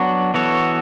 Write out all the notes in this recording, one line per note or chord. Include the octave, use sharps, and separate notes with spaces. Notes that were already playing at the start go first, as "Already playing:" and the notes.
Already playing: F#3 B3 D4 F#4
E3 B3 F#4 A4 C#5